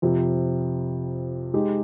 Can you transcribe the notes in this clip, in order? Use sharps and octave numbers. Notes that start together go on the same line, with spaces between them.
F2 C3 F3
G#3 D#4 G4